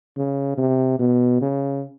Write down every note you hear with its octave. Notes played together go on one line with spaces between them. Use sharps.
C#3
C3
B2
C#3